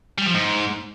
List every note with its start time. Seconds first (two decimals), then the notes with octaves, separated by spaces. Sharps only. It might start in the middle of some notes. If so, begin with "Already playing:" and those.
0.18 G3
0.26 F3
0.34 G#2